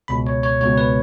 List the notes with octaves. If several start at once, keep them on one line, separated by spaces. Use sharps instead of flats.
C#2 B2 B5
C#5
C#5
C#2 B2 C#5
B4